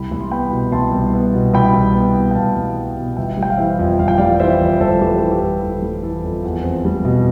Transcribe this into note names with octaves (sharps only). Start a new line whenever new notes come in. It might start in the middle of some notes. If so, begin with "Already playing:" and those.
Already playing: C2 G5 B5
C2
C6
B3 G5 B5
B2
C2 A5 C6
C2
B3
B2
C2 G5 B5
C2
B3
B2
G5
C2 F5 A5
C2
B3
B2
G1 E5 G5
G3
G5
F5
E3 C5 E5
F2
G1 F5
G5
G3 D5 F5
E3 C5 E5
F2
G1 A4 C5
G3 G4 B4
C5
E3 G4 B4
G4
F2 A4
G1 A4
G3
E3 A4
F2
E2
C4
G3
B2